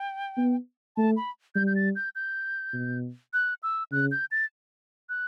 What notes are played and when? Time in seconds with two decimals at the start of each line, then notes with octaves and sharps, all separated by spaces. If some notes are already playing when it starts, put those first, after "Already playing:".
Already playing: G5
0.38 B3
0.97 A3 A5
1.16 B5
1.55 G3 G6
1.67 G6
1.76 A6
1.96 G6
2.15 G6
2.73 B2
3.33 F#6
3.63 E6
3.92 C#3 F#6
4.12 G6
4.31 A6
5.09 F#6